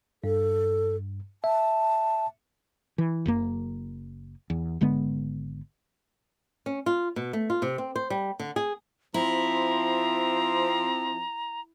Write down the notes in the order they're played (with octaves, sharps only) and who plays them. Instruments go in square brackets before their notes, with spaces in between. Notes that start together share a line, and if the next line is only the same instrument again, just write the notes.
[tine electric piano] G2 [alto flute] A4
[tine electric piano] E5 [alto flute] A5
[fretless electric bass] E3
F#1 F#2 A#3
E2
G#1 D3 G#3 B3
[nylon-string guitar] C#4
F4
B2
A3
F4
C3
C4
C5
G3
D3
G#4
[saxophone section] F3 C4 [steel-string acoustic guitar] E4 [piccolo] A#5